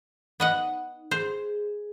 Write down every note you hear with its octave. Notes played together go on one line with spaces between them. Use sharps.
B3 D#4 D#5 F#5
G#4 C5